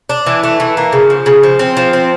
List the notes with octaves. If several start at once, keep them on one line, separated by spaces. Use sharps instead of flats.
D4
E3
A3
E3
A#3
C#3
F3
C#3
F3
C4
F3
C4